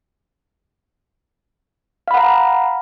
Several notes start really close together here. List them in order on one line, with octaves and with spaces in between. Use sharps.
F5 B5 F#5 A#5